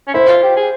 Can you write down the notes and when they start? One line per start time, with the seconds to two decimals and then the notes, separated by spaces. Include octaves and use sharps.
0.07 C#4
0.14 E4 C5
0.28 F4
0.42 G4
0.56 G#4